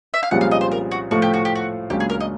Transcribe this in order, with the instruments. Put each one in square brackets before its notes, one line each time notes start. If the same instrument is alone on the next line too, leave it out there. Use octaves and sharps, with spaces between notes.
[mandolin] E5
F5
[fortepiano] C2 A#2 F3 G#3 C#4 [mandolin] F#5
[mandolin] F5
D#5
C5
A#4
F#4
[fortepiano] A2 F3 A3 [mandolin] F#4
[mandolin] G4
F#4
G4
F#4
[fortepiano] C#2 C#3 F#3 A#3 D4 [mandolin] G4
[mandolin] G#4
A#4
D#5